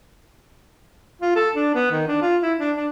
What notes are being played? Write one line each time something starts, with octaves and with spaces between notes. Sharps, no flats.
F4
A4
D4
B3
D#3
D4
F4
E4
D4
D4